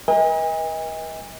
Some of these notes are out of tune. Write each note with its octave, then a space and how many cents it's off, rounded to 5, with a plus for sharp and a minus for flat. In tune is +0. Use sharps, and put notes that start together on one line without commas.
B4 -45 D#5 +40 G#5 -40